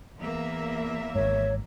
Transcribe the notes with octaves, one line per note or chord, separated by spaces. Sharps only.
E2 A#3 E5
G#1 G#2 C#5